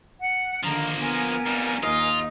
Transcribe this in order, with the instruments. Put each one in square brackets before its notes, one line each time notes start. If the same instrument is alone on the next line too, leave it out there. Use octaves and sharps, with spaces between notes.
[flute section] F#5
[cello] D3 D#3 [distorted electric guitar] F3 A#3 [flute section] A#5
[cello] B3 [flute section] A#4 G#5
[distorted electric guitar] F2 G3
[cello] D#2 D#4 [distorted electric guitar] F4 [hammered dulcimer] D#5